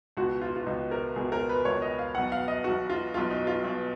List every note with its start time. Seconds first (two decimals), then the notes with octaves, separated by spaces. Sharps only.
0.17 C#2 B2 F#4
0.41 F4
0.56 F4
0.66 C#2 B2 D#4
0.91 A#4
1.16 C#2 B2 G#4
1.32 A#4
1.49 B4
1.65 C#2 B2 C#5
1.82 D#5
1.99 F5
2.15 B1 B2 F#5
2.32 F5
2.48 D#5
2.64 B1 B2 F#4
2.90 F4
3.14 B1 B2 F4
3.31 D#4
3.47 F4
3.63 B1 B2